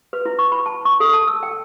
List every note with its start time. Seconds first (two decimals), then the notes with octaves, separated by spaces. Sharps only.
0.13 B4
0.25 E4
0.39 C#6
0.52 B5
0.66 A5
0.85 C#6
1.00 A4
1.13 A5
1.27 E6
1.43 G5